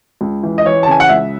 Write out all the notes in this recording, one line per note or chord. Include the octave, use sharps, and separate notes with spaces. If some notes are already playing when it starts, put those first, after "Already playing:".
C#2
E3
D#5
E3 C#5
A5
C#3 G#5
F#5
C#2 E5